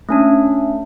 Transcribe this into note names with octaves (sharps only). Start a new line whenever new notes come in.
A3 C#4 D4